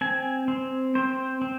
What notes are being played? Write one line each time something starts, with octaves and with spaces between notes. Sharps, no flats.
C4 G#5
C4
C4 C5
C4